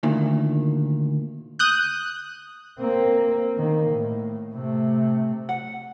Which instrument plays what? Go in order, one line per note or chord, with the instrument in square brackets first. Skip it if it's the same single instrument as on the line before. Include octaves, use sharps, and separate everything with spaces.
[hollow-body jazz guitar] D2 A#2 D#3
[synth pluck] D#6 F#6 G6
[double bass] A#3 C4
D#3 A#3
A2
C3 A3
[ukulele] F#5